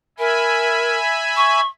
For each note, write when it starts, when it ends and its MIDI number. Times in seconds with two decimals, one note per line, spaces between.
0.19 0.97 70
0.19 1.61 76
0.19 1.61 80
0.19 1.61 83
1.36 1.67 85